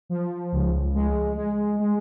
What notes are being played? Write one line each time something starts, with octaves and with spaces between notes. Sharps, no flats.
F3
C#2
G#3
G#3
G#3